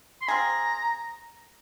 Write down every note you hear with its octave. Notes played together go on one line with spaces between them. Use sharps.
C6
C4 F4 G#4 A#5